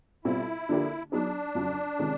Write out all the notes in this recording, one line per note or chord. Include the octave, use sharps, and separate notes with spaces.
B2 G3 C4 E4 F4 A4
D3 F3 A#3 D4 G4
F#3 B3 D4 D#4 G#4
F2 C#3 F#3
C3 D#3 G#3 C#4